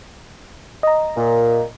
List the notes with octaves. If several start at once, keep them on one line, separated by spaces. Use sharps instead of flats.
D#5 A#5
A#2